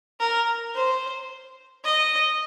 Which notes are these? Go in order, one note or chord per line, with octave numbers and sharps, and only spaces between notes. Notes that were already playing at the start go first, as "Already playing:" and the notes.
A#4
C5
D#5